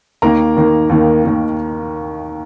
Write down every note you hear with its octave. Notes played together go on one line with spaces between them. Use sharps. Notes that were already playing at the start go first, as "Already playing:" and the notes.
D#2 D#3 A#3 A#4 A#5
D#2 D#3 A#3
D#2 D#3 A#3
D#2 D#3 A#3